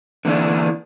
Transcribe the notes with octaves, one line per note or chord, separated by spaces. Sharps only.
D3 E3 A#3 D4 E4